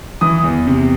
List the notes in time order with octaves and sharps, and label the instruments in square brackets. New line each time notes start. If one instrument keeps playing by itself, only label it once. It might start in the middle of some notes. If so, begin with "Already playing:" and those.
[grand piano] E3 D#6
E2
C3